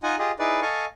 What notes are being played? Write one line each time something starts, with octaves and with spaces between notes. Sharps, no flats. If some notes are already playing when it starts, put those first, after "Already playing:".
D#4 F4 D#5 F#5 G#5
F4 G4 G#4 D#5
D#4 E4 G#4 B4 D5
A4 D#5 F5 G#5 C#6